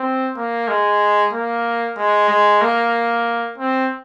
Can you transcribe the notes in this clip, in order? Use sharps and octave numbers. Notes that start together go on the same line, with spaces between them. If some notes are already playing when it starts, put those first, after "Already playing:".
Already playing: C4
A#3
G#3
A#3
G#3
G#3
A#3
C4